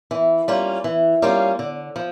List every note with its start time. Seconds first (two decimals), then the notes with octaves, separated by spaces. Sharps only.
0.11 E3
0.48 G3 A#3 C#4 F4
0.84 E3
1.22 G3 A#3 C#4 F4
1.59 D3
1.96 F3